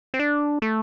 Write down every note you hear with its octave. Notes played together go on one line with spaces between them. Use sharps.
C4
D4
A3